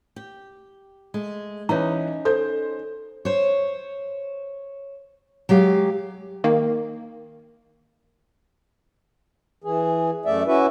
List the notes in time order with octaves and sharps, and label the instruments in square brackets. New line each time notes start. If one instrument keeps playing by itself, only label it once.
[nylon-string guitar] G4
G#3 A3
[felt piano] E3 B4 [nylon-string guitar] C#4 D#4 D#5 [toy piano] C#5 A#5
[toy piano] A4 [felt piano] C5 G6
[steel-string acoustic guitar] C5 C#5
F#3 G#3 G4 F5
[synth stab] D#3 A#3
[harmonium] E3 G#4
F#2 A3 D5 E5
C#4 E4 F#4 B4 E5